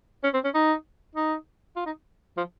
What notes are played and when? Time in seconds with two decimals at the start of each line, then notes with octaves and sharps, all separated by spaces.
0.24 C#4
0.34 C4
0.44 C#4
0.54 D#4
1.16 D#4
1.76 F4
1.86 D#4
2.37 F3